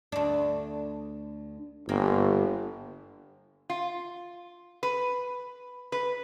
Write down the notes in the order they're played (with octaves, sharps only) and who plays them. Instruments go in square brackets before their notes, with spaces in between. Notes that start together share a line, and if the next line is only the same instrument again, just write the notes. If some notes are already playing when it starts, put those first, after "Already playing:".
[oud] D2 D4
[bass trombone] G1 [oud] A#3
[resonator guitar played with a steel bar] F4
B4
B4